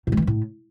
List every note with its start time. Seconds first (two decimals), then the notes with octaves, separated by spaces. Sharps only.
0.07 A2
0.12 G#3
0.17 E3
0.22 G2
0.27 A2